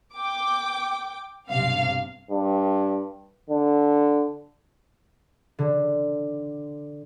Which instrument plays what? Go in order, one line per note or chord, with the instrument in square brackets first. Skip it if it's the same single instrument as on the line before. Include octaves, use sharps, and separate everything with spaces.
[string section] G5 D6
B1 G2 C3 F5
[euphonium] G2
D3
[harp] D3